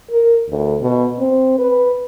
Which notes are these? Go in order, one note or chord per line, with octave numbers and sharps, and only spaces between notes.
A#4
D2
B2
C4
B4